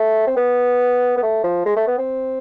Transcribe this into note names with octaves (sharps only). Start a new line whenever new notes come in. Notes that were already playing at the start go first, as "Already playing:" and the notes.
Already playing: A3
C4
B3
B3
A3
F3
G#3
A3
B3
C4